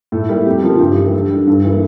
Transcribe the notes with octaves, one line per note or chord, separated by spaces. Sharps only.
A2 A4
G3 A#3 E4
F2 G4
C#3 F3 A#3 F4
G2 G4
E3 A#3
G4
D3 A4
G3 D4
G2 A4
E3 A#3